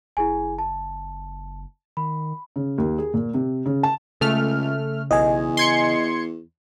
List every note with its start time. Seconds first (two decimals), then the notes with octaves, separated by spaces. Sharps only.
0.17 F#1 E4 G#4 G#5
0.59 A5
1.97 D#3 B5
2.56 C#3
2.78 D#2
2.98 G#4
3.14 A#2
3.34 C3
3.66 C#3
3.83 A5
4.21 C#2 C#3 A3 F6
5.11 B1 E2 D#5 G#5
5.57 C6 G#6 C#7